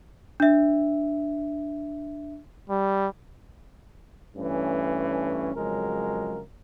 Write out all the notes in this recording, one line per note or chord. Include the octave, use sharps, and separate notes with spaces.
D4 E5
G3
G2 E3 A3 C#4
F2 C#3 F#3 G#3 A#4